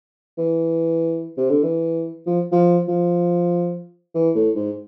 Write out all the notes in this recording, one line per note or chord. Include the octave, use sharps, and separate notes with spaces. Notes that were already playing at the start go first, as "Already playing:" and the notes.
E3
C3
D3
E3
F3
F3
F3
E3
A2
G#2